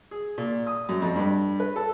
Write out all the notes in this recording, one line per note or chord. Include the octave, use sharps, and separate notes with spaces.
G#4
A#2
D#6
F#2
F2
G2
B4
A4